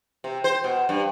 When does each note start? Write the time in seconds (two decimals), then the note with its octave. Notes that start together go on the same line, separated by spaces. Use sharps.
0.24 C3
0.44 C5
0.64 B2
0.89 G2